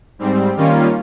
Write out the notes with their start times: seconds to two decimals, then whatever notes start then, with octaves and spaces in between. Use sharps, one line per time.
0.19 G#2 G3 C4
0.57 D#3 G3 A#3 C#4 F4